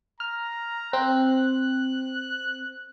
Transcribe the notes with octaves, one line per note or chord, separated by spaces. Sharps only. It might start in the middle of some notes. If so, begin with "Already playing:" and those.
A#5 F6
C4 F#6